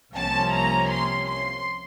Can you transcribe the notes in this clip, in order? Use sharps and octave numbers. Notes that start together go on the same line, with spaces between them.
C2 C3 F3 A#3 C#4 A5
A#5
C6
C6